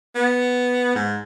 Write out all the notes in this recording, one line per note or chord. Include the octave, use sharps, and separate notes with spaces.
B3
G#2